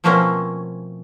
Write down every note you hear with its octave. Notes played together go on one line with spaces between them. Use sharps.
B2 F3 A3 A#3 C4 C#4